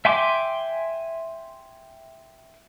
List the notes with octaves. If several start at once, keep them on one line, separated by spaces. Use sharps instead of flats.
E5 G5 G#5 C6 D6